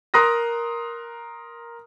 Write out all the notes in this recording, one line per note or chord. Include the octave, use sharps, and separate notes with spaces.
A#4 A#5 C6 D#6 F#6 A#6